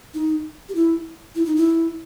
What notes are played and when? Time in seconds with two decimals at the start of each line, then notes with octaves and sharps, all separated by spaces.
0.14 D#4
0.69 G4
0.75 E4
1.35 E4
1.45 D#4
1.56 E4